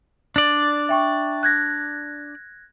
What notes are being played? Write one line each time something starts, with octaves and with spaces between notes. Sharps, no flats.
D4 D5
E5 G5 C#6
F#6 G#6 A#6